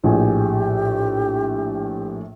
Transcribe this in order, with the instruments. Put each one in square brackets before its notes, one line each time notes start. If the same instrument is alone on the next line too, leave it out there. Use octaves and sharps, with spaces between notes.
[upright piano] A#1 A2 G#4 [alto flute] G4